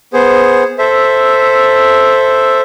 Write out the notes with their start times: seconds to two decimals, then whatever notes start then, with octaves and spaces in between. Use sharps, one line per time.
0.13 B3 G#4 C5
0.79 A4 C5 E5